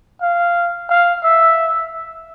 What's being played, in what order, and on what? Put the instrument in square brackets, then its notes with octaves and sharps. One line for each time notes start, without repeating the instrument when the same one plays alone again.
[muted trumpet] F5
F5
E5